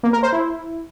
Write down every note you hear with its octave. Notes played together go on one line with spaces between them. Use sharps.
A#3
A#4
C5
E4